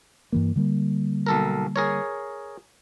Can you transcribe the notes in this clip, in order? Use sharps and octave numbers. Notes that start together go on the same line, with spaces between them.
G2 E3 A#3
D3 G3 A#3
B1 A4 A#4
G#4 A#4 C#5